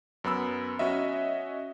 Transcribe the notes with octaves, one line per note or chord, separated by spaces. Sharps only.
F#2 B3 B5 E6
C#4 F#4 D#5 E5